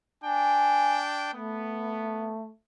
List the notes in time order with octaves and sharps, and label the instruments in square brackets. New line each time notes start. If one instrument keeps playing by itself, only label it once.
[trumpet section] D4 G5 [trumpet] G#5
[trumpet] A3 [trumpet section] B3